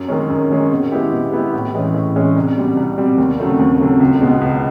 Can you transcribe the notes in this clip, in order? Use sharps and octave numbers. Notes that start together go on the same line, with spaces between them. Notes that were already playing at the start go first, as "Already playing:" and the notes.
Already playing: F#2
D#3 G#3 C#4
F#2
D#3 G#3 C#4
B2
G#3 B3 E4 G4
B2
G#3 B3 E4 G4
A2
E3 G#3 C#4
A2
E3 G#3 C#4
C2
B2 G3 C4
C2
B2 G3 C4
D#2
C#3 F#3 A3 C4
D#2
C#3 F#3 A3 C4
C#2
B2 G#3 B3
C#2